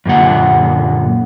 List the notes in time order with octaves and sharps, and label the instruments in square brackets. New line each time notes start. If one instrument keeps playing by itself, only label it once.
[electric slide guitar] F#2 A#2 D3 F#5